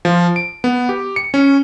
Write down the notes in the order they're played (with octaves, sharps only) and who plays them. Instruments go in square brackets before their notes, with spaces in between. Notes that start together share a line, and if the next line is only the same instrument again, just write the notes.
[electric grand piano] F3
D7
B3
G4
C#7
C#4